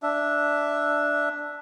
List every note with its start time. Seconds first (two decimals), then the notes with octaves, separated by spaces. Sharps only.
0.03 D4 E5